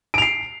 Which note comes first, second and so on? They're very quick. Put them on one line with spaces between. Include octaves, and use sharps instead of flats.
D7 F7 C7